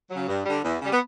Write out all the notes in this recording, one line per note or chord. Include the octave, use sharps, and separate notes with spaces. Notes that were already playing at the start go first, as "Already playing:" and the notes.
C#3 F#3
G2
D3 G3
E2
C#3 G3
B3